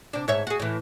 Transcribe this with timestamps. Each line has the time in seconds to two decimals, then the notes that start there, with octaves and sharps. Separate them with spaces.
0.13 C3 D4
0.28 G#2 C#5 E5
0.47 F#4 G#4
0.60 A2 E3